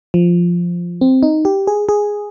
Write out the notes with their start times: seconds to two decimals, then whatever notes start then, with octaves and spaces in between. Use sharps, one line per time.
0.14 F3
1.01 C4
1.23 D#4
1.45 G4
1.67 G#4
1.89 G#4